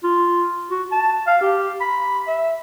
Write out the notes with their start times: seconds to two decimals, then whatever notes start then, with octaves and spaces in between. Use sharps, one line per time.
0.04 F4
0.70 F#4
0.92 A5
1.27 F5
1.42 G4
1.81 B5
2.28 E5